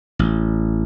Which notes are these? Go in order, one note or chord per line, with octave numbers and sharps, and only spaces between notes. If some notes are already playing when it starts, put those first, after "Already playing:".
A1